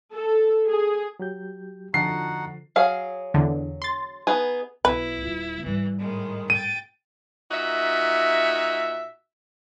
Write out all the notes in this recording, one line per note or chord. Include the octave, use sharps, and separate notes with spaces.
A4
G#4
F#3 G4 G6
F2 D3 F3 D#4 F#4 F#5 A5 C7
F#3 G#4 F5
E2 D3
C6 A6
B3 D#4 G#4 G#5
B1 E4 B4
D#1 F4
G#2 E3 G3
A2 D#3 G#3
G5 A6 D#7
A#2 D#4 F#4 E5